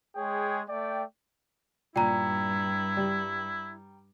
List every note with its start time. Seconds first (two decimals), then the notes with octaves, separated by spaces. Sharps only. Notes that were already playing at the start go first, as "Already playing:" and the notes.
0.16 G#3 G#4 C#5 G5
0.69 A3 D5 G5
1.96 G2 A#2 E4 G5 A#5
2.97 G3